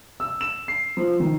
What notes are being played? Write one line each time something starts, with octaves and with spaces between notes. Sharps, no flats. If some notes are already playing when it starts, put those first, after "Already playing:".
E6
E7
C7
F3
D#3